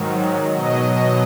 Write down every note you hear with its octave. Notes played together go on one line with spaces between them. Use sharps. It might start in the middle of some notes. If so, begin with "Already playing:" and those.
Already playing: G#2 D#3 F#3
B2 F#3 D#5